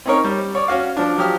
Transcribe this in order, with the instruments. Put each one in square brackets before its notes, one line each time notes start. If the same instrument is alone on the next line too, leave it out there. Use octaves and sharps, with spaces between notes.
[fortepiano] C4 C#4 D#4 A#4 C#5
G3
C#5 D5
C#4 F#4 F5
F3 D4
F3 F#3 G4 D#6 F6